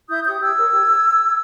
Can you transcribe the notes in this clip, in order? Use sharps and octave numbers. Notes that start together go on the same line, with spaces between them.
E4 D#6 G6
G4 C#5 D#6 G6
G4 E6 G#6
A#4 C#5
G4